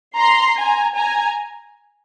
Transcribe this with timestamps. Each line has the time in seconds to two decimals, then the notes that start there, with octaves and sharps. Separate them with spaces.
0.17 A#5 C6
0.57 G#5 A#5
0.97 G#5 A#5